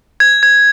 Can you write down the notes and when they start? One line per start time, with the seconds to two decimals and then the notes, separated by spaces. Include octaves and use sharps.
0.20 G#6
0.43 G#6